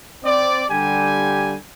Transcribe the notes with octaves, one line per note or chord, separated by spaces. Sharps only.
C4 D5
D3 G3 G4 G#5